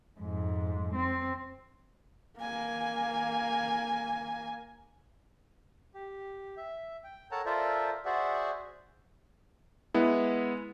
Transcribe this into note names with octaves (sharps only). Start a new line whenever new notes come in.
F2 G#2
C4
A#3 G#5
G4
E5
G5
A4 A#4 C#5 F#5 A5 A#5
F4 A4 A#4 C5 D5 E5
F#4 G#4 C5 D5 E5 F#5
G#3 B3 E4